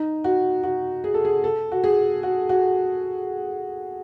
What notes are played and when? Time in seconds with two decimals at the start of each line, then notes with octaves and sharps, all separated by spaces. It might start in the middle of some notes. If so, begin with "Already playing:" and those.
Already playing: D#4
0.24 F#4
0.64 F#4
1.04 G#4
1.14 A4
1.25 G#4
1.44 A4
1.72 F#4
1.84 G#4
2.23 F#4
2.49 F#4